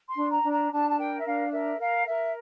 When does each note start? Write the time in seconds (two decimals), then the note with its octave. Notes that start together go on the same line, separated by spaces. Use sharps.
0.08 C6
0.16 D4
0.29 A#5
0.43 D4
0.49 A#5
0.70 D4 A5
0.89 A5
0.97 A#4 G5
1.18 E5
1.25 D4 F5
1.51 A#4 E5
1.78 A#4 F5
2.06 A#4 E5